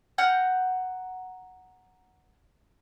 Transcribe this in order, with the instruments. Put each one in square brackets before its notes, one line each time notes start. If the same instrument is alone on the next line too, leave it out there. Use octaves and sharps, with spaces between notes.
[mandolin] F#5 A#5 F6 G6